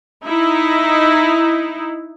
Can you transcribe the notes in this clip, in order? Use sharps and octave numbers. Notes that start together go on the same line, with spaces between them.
D#4 E4